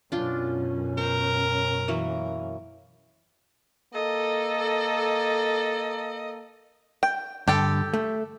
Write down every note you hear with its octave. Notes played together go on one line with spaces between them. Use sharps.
F#2 B2 C#4 D4 F4 G5
A#4 C5
E3 F#3 A#3
A#3 A4 D#5
G5
G2 D3 G4 A4 G5
A3